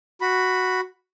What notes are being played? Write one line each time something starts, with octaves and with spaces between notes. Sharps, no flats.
F#4 B5